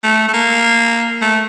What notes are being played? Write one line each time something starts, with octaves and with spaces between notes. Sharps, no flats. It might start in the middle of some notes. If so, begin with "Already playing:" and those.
A3
A3
A#3
A3